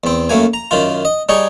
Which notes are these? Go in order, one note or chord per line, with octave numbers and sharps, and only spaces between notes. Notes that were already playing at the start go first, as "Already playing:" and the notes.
E2 C4
F#2 A3 A#3 G#5
A#5
F#2 D#3 F4
D#5
G3 D#4 G#4 C#5